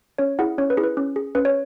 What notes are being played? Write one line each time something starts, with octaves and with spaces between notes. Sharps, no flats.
C#4 C#5
E4 G#4 F#5
C#4 C#5
B4
E4 G#4
B4
C#4
G#4
C#4 B4
C#5